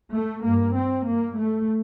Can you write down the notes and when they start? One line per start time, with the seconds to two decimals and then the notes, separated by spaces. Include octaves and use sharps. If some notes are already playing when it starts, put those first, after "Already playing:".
0.12 A3
0.43 G2 A#3
0.75 C4
1.07 G2 A#3
1.38 A3